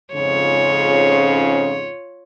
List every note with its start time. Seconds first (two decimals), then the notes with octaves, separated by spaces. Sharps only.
0.14 F2 G#2 C#3 F4 C#5